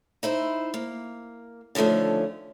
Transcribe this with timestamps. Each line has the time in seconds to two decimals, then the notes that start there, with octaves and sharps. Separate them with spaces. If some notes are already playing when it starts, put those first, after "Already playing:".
0.23 D#4 E4 C5
0.74 A#3
1.75 D3 D#3 F3 A3 C#4